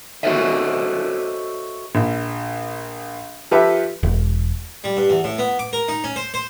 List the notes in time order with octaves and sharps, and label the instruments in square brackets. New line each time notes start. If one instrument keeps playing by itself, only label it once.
[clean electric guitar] F#4 A4 C5 C#5 D#5 E5
[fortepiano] A#1
F3 G4 A4 B4 E5
[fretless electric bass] E1
[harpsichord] G3
G2
E2
A2
B3
D6
A#4
D#4
C#4
C5
C5